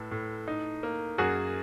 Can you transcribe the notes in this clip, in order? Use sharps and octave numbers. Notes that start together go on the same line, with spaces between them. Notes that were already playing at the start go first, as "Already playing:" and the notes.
Already playing: A2 A4 B4
A2
D#4
A#3
F#2 F#4 G#4